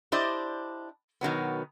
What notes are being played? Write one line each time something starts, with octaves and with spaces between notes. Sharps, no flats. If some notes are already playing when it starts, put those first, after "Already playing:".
D4 E4 G4 C5 D5 D#5
B2 D#3 F#3 B3